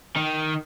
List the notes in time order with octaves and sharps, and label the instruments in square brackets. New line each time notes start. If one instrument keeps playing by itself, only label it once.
[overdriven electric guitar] D#3